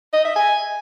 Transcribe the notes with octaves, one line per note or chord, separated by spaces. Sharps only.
D#5
E5
G#5